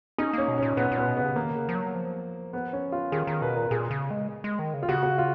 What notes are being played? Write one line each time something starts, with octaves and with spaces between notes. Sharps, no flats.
C#4 D#4
A#3 C#4
B2
A#2 C#4
A#2 B3
A#2
B3
B2
C#3 B3
D#3 A#3
C#3
F3
F#3
F3
B3
C#4
F4
D#3 G#4
D#3 A#4
B2 B4
A#2 A#4
A#2 G#4
C#3
G#3
G#3
D#3
C#3
F4
C#3 F#4
F#4
F4